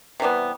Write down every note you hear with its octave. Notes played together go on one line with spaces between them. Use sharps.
C3 E3 G3 B3